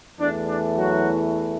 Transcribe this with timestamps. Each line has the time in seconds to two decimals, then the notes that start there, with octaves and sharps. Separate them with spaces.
0.20 E2 E3 A3 D4
0.48 D4
0.76 F#3 F#4